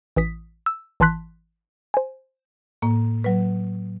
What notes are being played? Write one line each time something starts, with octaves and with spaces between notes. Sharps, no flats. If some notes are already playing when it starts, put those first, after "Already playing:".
A1 E3 D#6 B6
E6
G#1 E3 A5 C6 F#6 B6
C5 G#5
A2 A#3
F#3 B4